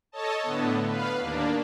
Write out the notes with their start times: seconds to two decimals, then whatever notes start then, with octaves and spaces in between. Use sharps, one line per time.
0.12 A4 C#5 D#5 A5
0.43 A2 D3 B3
0.87 B4 F5
1.20 D#2 A#3 D4